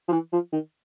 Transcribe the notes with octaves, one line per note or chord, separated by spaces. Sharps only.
F3
E3
F3
D#3